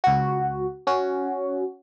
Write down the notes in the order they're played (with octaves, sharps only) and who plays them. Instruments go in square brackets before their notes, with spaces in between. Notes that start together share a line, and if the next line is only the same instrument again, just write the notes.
[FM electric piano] C#2 F#4
C#4 F#4